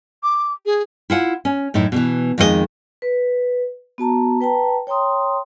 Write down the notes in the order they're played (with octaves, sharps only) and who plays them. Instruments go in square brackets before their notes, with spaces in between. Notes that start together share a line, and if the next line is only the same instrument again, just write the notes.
[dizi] D6
G#4
[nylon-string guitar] E4 F4 F#5
C#4
F#2 A2 D#4 E4
B2 D3 E3
F2 D#3 G#3 G4 D#5
[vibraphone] B4
B3 F#4 A5 A#5
B4 G5 A5 A#5
C#5 G5 A#5 C6 D#6